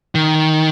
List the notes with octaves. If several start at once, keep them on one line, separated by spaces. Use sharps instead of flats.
D#3